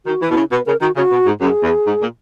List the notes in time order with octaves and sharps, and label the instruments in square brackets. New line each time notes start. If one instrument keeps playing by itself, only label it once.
[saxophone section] D#3 [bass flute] F#4
[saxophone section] E3
[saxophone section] B2 [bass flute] E4
[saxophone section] C#3
[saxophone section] B2 [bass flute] B4
[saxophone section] C#3 [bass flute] A#4
[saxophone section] D#3 [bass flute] F#4
[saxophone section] C#3 [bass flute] F#4
[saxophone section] B2
G#2
[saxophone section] F#2 [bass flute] G#4
[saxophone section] E2
G#2
A#2